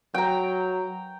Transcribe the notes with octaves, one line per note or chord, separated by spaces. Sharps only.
F#3 G5 A#5